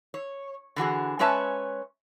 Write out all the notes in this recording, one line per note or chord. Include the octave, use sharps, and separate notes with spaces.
C#5
D3 E3 F#4 G#4
G#3 C#4 B4 C#5 E5 A5